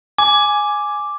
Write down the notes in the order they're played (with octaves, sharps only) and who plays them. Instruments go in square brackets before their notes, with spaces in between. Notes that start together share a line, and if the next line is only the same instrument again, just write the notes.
[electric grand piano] G#5 [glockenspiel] D6